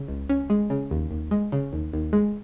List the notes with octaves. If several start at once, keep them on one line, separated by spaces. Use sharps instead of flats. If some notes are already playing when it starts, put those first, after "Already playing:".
Already playing: C#3
C#2
C#4
G#3
C#3
D#2
D#2
G#3
C#3
D#2
D#2
G#3